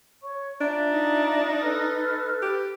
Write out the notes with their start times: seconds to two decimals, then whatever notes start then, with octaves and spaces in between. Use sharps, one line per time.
0.23 C#5 C#6
0.61 D4 F4 E5 A#5
0.93 D#4
1.61 A4 B4 F6
2.42 G4